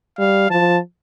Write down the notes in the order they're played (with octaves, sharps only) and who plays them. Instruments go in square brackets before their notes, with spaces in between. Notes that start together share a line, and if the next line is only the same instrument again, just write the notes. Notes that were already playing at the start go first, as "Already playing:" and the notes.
[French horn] G3 [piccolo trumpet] F5
[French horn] F3 [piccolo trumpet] A5